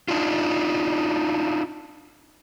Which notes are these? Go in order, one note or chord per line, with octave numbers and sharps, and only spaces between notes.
D4 D#4 F4